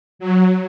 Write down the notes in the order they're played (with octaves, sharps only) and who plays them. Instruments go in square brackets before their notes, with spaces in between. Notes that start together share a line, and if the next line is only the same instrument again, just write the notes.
[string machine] F#3